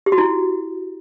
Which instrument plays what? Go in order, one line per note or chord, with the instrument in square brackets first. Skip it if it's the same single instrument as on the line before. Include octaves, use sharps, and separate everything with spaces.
[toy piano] G4
F#4
E4